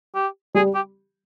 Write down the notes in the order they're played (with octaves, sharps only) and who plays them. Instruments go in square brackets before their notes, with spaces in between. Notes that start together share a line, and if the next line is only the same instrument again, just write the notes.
[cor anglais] G4
[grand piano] G3 [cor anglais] G#4
[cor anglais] G4